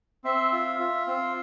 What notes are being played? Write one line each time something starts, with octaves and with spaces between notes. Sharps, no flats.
C4 E5
F4
F4
C4